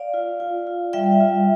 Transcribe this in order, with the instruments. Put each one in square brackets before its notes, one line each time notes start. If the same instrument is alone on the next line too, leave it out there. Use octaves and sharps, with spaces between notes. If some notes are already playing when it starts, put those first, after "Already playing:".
Already playing: [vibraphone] D5 F5
F4
F4
F4
G3 E5 G5
F4